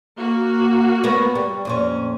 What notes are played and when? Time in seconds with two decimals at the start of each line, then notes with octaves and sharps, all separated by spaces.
0.18 A#3 F#4
1.04 B3 A#4 C#5
1.35 G3
1.65 F2 A#2 C#4